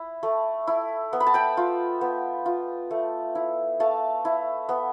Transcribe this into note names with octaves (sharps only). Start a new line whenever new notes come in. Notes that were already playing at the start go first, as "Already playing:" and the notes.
Already playing: E4 B5
A3
E4
B3
B5
A5
G5 B5
F4
B3
F4
A3
E4
A3 F5 A5
E4
B3